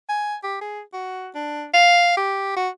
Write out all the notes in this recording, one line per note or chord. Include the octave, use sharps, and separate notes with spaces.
G#5
G4
G#4
F#4
D4
F5
G4
F#4